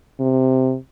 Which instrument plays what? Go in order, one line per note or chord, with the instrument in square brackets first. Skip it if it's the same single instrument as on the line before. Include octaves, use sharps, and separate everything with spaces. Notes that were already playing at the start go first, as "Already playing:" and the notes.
[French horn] C3